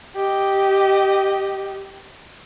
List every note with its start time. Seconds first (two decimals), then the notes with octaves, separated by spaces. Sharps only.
0.16 G4 D#5